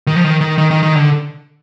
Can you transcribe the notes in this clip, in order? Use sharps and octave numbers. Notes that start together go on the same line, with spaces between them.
D#3
F3
D#3
D#3
D#3
D#3
D#3
D3